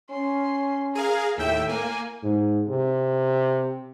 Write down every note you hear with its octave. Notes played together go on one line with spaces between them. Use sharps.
C#4 C6
G#4 A#4 F5
D#2 A2 E5 G5
A#3 G#5
G#2
C3